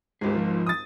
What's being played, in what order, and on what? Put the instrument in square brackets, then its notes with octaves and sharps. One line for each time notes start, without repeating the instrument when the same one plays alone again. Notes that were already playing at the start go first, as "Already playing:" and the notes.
[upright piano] G#1 C#2 G#2 [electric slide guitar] G4 G#4
[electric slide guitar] F3 F4
[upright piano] D#6 A6